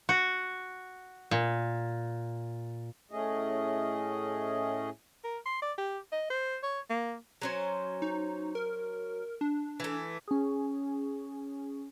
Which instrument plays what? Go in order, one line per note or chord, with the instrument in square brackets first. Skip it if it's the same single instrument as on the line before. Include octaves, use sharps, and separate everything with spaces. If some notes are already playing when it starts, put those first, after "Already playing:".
[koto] F#4
A#2
[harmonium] A2 A3 C#4 G#4 D#5
[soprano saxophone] A#4
C6
D5
G4
D#5
C5
C#5
A#3
[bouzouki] F#3 C#4 C5
[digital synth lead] D#4
A#4
D4
[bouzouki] E3 A3
[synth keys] C#4 G#4